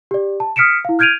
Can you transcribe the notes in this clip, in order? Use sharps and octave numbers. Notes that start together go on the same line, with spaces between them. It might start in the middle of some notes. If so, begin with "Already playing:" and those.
G4 D5
A5
D#6 F6 B6 C#7 D7 E7
E4 F5
F6 G6 G#6 D7 D#7 F7